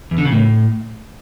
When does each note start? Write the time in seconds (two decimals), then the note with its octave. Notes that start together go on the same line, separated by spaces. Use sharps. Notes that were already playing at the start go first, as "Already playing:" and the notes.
0.11 E2
0.18 D3
0.25 C#3
0.32 A2